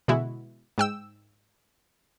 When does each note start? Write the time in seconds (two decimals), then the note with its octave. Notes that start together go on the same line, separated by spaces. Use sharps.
0.08 B2 D3 E3 G#3 E4 F#4
0.78 G#2 G5 E6